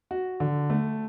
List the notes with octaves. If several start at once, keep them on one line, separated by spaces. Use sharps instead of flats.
F#4
D3
A3